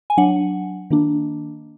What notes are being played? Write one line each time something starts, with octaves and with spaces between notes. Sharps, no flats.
G#5
F#3 D4 F#5
D#3 A#3 D4